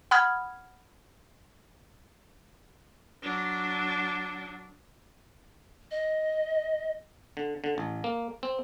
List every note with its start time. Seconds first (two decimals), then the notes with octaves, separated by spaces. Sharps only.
0.11 F#5 B5 D#6 F6 G#6
3.22 F#3 D4
5.91 D#5
7.37 D3
7.64 D3
7.78 A1
8.04 A#3
8.43 C4